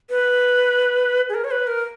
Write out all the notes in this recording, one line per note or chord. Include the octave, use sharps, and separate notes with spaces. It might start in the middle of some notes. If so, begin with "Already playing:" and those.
B4
G#4
A#4
C#5
B4
A#4